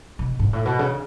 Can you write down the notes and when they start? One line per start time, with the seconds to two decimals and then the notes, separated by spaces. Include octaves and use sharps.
0.19 B2
0.39 G#2
0.53 A2
0.65 B2
0.79 C#3